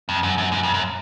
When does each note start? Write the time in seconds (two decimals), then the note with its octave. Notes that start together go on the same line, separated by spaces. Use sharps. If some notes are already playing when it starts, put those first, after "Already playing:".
0.09 F2
0.23 F#2
0.38 F#2
0.52 F#2
0.63 F2
0.74 F#2